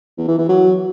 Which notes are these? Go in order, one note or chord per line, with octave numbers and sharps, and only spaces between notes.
E2
E3
E3
F#3